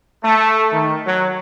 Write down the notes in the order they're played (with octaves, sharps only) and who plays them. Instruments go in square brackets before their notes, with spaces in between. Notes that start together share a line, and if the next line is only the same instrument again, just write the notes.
[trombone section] A3
D#3
F#3